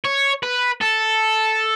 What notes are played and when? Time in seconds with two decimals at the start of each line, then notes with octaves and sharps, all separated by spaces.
0.04 C#5
0.43 B4
0.81 A4